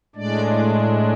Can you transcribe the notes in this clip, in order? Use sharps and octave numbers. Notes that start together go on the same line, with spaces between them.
A2 G#3 D4 D5